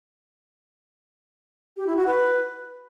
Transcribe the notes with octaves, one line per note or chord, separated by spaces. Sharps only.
G4
E4
F#4
B4